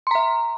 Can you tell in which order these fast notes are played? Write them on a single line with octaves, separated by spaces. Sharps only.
C6 A#5 E5